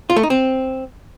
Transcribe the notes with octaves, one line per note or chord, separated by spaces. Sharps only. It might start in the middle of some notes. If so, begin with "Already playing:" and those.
F4
A3
D#4
C4